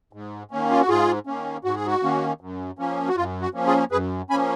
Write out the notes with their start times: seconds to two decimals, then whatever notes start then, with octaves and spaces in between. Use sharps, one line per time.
0.13 G#2
0.51 D#3 A#3 C#4
0.71 F4
0.81 F#4
0.89 G#2 F4 G#4
1.27 D#3 A#3 C#4
1.64 G#2 F#4
1.75 G#4
1.87 F#4
2.03 D#3 A#3 C#4
2.41 F#2
2.79 F3 A#3 C#4
3.08 F#4
3.16 F#2 F4
3.41 F#4
3.54 F3 A#3 C#4
3.67 F4 G#4
3.92 F#2 G#4 B4
4.30 F3 A#3 C#4 G#5 B5